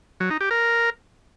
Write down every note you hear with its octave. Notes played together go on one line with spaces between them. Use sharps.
F#3
D#4
G4
A#4